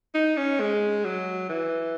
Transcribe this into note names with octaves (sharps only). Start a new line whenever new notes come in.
D#4
C#4
G#3
F#3
E3